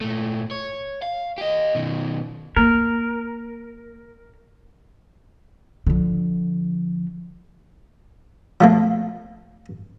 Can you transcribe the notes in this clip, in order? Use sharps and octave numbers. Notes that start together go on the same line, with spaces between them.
A#2 A3
C#5
F5
G4 D#5
B2 D#3
A#3 A#4
D3 F3
F3 A3 A#3